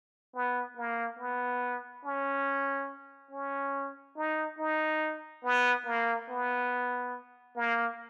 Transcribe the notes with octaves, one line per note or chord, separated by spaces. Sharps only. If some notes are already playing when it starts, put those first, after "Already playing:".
B3
A#3
B3
C#4
C#4
D#4
D#4
B3
A#3
B3
A#3